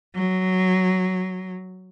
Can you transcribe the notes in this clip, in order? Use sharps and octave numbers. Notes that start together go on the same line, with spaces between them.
F#3